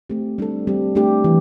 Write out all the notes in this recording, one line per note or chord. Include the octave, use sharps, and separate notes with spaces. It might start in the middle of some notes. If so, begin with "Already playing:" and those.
A3 C4 G4
G3 D4 A4
G3 C4 G4
A3 D4 G4
E3